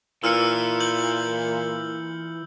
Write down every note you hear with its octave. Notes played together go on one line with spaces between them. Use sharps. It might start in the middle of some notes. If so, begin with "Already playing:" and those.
A#2 E3 E6 F6 C#7
G6 F#7